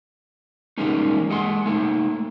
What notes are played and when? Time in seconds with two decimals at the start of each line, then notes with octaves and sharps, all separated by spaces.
0.78 E3 G3 G#3 A#3 C#4 D#4
1.30 G#3 A4 F#5 C6
1.66 A3 A#3 D#4 A4